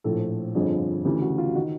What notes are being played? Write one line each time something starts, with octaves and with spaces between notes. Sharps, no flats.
A#1 A2 F3 A4
G1 F2 D3 F3 G#4
D2 C#3 E3 G4
F#4
F4
D#3 F#4